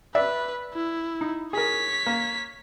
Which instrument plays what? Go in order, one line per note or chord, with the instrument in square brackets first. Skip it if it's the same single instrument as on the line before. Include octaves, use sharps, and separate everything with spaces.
[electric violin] B4 [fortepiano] D5 E5
[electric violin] E4
[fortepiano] D#4
[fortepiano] G#4 A#4 [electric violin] C#5 B6
[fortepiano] A#3